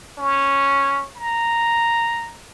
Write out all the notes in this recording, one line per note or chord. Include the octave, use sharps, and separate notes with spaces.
C#4
A#5